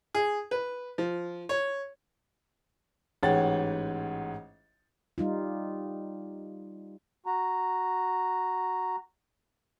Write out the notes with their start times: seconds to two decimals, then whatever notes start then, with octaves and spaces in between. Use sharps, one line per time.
0.15 G#4
0.51 B4
0.98 F3
1.49 C#5
3.23 A1 G#2 C#5 F#5 G5 A6
5.18 G3 D#4 F4
7.26 F#4 A#5